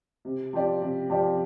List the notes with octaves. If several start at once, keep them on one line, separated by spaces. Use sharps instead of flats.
C3
F3 C4 G4 D5
C3
F3 C4 G4 D5